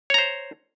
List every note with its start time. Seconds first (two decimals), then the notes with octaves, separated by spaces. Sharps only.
0.10 C#5
0.14 A#5
0.18 C5